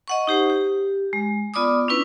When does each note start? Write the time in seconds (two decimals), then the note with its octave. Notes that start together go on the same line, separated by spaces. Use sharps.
0.08 D#5 F#5 C#6
0.27 D#4 G4 C5
0.50 G4
1.13 G#3
1.54 B3 F4 D5 B5 D6 D#6
1.88 C#4 D4 E4 B4